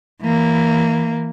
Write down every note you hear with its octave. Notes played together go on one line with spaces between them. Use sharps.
E3 A#3